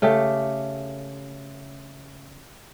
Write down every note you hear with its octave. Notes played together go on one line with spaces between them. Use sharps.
C#3 A3 G4